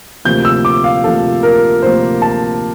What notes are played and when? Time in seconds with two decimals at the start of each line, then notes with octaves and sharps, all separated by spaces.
0.25 D2 C3 F3 A#3 G6
0.45 E6
0.65 D6
0.84 F5
1.03 D2 C3 F3 A#3 A4
1.43 A#4
1.82 D2 C3 F3 A#3 C5
2.22 A5